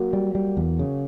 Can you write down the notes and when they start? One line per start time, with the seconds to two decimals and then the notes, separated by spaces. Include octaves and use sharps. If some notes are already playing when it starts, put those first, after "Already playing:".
Already playing: F#3 A#3
0.13 G3
0.35 G3
0.57 E2
0.79 C#3